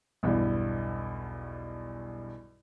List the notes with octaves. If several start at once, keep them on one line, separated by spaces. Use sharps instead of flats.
B1 E2 G2